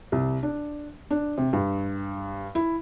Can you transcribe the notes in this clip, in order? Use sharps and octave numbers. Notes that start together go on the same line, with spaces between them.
C2
D4
D4
C3
G2
E4